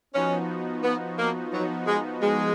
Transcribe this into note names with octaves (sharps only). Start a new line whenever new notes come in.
F3 B3 C#4 D#4 F#4
B3
A#3
F3 F#3 B3 D#4 F#4
G#3
G#3